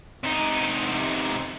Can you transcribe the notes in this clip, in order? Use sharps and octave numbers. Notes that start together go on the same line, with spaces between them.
C3 D#4